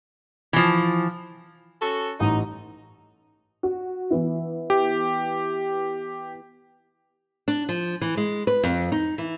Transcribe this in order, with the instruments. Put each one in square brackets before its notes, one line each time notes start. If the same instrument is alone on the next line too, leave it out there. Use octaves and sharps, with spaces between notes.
[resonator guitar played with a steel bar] E3 F3
[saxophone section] C#4 F#4 A4
[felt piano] A1 [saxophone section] D#4
[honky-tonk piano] F#4
E3 B3 E4
[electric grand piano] G4
[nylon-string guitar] D4
F3
E3
G#3
B4
F2
D#4
E3